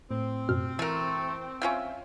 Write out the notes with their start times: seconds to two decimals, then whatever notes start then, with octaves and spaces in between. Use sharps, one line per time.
0.11 A2 C4
0.49 F#2 B2 F6
0.79 E3 A3 A#4
1.62 C#4 F4 E5 G5